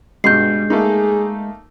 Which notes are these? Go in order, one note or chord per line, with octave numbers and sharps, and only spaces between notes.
G2 B2 G3 G#3 G6 C7
A3 A#3 D#4 G#4